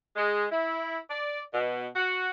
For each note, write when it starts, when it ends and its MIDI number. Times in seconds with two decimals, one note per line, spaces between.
0.15 0.45 56
0.51 0.98 64
1.10 1.40 74
1.52 1.86 47
1.95 2.29 66